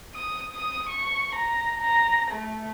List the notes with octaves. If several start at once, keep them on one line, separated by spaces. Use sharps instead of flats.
D#6
D#6
C#6
A#5
A#5
A3